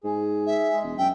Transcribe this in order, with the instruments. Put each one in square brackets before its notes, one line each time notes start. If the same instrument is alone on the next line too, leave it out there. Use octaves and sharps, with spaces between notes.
[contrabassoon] G#2 [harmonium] G#4
[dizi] E5
[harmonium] G#3 G#4
[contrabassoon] E1
[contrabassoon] F#2 [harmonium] E5 [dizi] G5